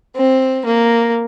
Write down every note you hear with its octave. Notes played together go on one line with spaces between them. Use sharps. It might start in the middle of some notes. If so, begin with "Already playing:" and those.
C4
A#3